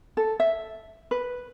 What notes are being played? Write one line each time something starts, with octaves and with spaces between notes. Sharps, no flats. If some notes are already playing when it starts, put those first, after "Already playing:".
A4
E5
B4